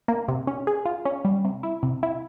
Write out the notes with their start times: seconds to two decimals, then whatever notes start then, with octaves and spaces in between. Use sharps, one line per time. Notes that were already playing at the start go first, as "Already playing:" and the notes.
0.08 A#3
0.28 C3
0.47 C#4
0.67 G#4
0.85 F4
1.05 C#4
1.25 G3
1.45 C3
1.63 E4
1.83 C3
2.03 E4